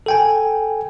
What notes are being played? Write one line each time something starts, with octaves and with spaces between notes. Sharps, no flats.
A4 G5 G#5